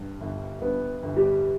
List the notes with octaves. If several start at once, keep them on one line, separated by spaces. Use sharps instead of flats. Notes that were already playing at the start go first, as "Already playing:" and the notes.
Already playing: G2
G1
G2 B3 B4
G1
G3 G4